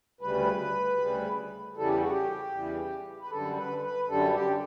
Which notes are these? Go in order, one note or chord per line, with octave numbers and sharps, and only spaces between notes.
D2 C#3 G3 B4
D2 C#3 G3
E2 C#3 E3 G3 A4
G4
F#4
G4
E2 C#3 E3 G3
B4
F#2 D3 G3 A4
B4
B4
F#2 D3 G3 A4
G4